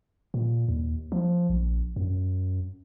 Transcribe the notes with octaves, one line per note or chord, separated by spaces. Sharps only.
A#2
D#2
F3
A#1
F#2